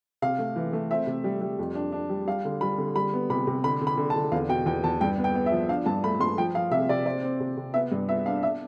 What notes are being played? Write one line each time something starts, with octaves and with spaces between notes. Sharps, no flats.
C3 F5
A3
E3
A3
C4 E5
C3
G3
G3
F2
D4
D4
G3
G3 F5
D3
G3 B5
D3
G3 B5
B3
C3 B5
C3
D3 B5
D3
B5
D3
A5
D3
E2 F5
B2 G5
E2 G5
E2 A5
G2 G5
B3
G5
B3
E5
F3
D4 F5
G2 A5
A3 B5
G2 C6
F3 G5
F3 F5
C3 E5
C3 D5
C4 D5
C4
C3
C3
B3 E5
G2
B3 E5
D4 F5
E5